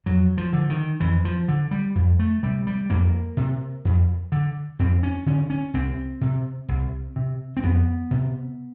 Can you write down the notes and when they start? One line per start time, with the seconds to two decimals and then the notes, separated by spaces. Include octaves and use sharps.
0.06 F2 F#3
0.38 F3
0.53 D3
0.70 D#3
1.00 F2 E3
1.25 F3
1.48 D3
1.71 G3
1.95 F2
2.19 A3
2.43 C3 G3
2.67 G3
2.90 F2 A#3
3.37 C3
3.85 F2
4.32 D3
4.79 F2 C4
5.03 C#4
5.26 D3 C#4
5.50 C#4
5.74 C2 C4
6.21 C3
6.68 C2
7.16 C3
7.57 C4
7.63 F2 B3
8.11 C3